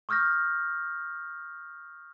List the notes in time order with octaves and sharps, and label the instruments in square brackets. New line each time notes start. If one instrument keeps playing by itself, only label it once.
[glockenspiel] C#6 D#6 F6 G6 A#6